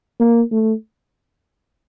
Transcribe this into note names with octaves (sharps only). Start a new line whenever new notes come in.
A#3
A3